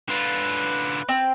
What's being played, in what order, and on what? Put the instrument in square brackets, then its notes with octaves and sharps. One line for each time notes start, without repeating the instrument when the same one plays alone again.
[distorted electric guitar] D3 F4 [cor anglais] B4
[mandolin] C4